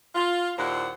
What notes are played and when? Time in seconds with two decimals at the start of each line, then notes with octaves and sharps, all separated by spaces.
0.15 F4
0.57 D#2 A#2 E4 C5 F#5